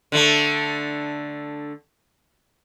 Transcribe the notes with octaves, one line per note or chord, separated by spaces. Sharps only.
D3 A3